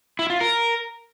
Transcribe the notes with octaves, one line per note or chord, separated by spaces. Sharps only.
E4
F4
A#4